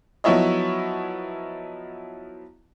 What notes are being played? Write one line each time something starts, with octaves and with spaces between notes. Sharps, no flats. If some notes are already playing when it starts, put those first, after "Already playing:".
F3 F#3 B3 E4 C#5 D#5